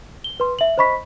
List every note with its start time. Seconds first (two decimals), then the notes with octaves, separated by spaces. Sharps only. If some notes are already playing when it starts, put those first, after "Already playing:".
0.24 G7
0.40 B4 C6
0.59 E5 F#7
0.78 C5 D#5 B5 C#6 B6